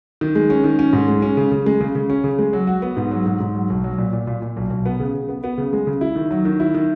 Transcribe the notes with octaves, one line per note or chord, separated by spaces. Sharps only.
D#3
G#3
C#4
D#3
C#4
G#2
G#3
C#4
C#3
C#3
G#3
C#3
C#3
C#4
C#3
G#3
F#3
F#4
B3
G#2
F#3
G#2
G#2
F#3
B1
F#3
A#2
A#2
A#2
A#2
B1
B1
B3
C#3
C#3
B3
B3
C#3
G#3
C#3
E4
D#3
F#3
D#3
E4
D#3